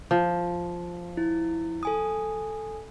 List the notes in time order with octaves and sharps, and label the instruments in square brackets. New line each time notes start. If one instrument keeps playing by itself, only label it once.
[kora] F3
[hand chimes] E4
A4 G#5 D#6